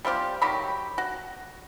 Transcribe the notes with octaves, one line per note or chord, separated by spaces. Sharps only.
G3 C4 F4 G4
D#3 F#3 G4 B5
F#4